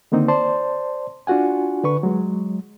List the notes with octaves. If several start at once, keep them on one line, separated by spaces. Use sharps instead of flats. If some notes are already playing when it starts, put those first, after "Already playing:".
D3 D#3 A#3 C4 D#4
C5 D5 A5 C6
D4 F4 F#4 F#5 G#5
D3 B4 C#6
F#3 G#3